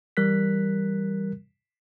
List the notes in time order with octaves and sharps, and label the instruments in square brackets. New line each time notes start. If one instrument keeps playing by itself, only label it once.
[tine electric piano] E3 G3 A#4 F#6 B6